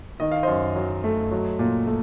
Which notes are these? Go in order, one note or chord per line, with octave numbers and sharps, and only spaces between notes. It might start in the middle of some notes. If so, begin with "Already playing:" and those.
D#3 D#5
F5
F#2 C5 D#5
F#3
A3
F#3
A#2
A3